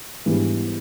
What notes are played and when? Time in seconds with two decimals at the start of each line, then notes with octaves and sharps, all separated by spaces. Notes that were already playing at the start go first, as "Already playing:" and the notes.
0.26 G#2 E3 G3 B3 D4